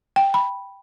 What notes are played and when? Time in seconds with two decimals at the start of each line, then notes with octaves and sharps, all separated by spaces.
0.16 G5
0.34 B5